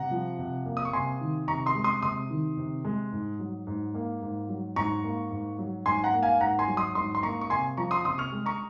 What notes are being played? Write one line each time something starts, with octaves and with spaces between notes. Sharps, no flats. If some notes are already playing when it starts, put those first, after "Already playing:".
Already playing: C3 F#5 A#5
F3
C3
A#3
D#6
C#6
C3 G#5 C6
D#3
C3 A#5 C#6
C6 D#6
G#3
C6 D#6
C3 C6 D#6
D#3
C3
G#3
G#2
F#3
G#2
A#3
G#2
F#3
G#2 A#5 C#6
A#3
G#2
F#3
G#2 G#5 C6
F#5 A#5
A#3
F5 G#5
G#2 F#5 A#5
G#5 C6
F#3
C6 D#6
G#2 C6 D#6
C6
A#3 A#5 C#6
C#6
C3 G#5 C6
F3 A#5 C#6
C6 D#6
C3 C6 D#6
C#6 F6
G#3
A#5 C#6